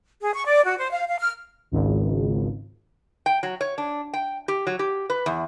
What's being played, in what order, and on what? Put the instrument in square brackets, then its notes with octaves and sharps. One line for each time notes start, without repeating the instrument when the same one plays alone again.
[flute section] G#4
C#6
D5
F#4
C5
F5
F5
F6
[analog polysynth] G#1 C#2
[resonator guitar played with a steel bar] G5
F#3
C#5
D4
G5
G4
F#3
G4
B4
E2